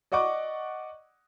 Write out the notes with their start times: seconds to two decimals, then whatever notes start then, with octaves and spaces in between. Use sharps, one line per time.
0.12 D5 D#5 F#5 C#6 D6